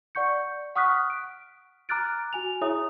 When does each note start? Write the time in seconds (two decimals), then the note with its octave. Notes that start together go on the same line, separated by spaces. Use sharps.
0.15 D5 F#5 C#6 G6 C#7
0.75 F#5 C#6 D#6 F6 F#6 B6
1.10 D7
1.89 A#5 D6 F6 F#6 A6 D7
2.33 F#4 G#5 F7
2.61 E4 G#4 C#5 E5 A#5 D#6